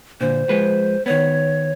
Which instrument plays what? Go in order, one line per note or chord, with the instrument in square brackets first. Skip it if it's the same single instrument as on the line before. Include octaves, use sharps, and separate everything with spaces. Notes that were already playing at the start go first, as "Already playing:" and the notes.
[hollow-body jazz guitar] A#2 D3 [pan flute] C5
[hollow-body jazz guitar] F3 G#3 B4
[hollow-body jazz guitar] D#3 B3 [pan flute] C#5